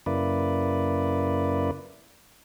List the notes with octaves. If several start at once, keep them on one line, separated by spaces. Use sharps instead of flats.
F#2 C#3 A#3 E4 B4 D5